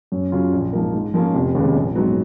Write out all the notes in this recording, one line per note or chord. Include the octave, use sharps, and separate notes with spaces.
F#2
C#3 F#3 C#4 F4
A#1
G#2 F3 A#3
G#2
F3 A#3 C#4 F4
F1
D#2 C#3 G#3 B3
A#1
G#2 F#3 B3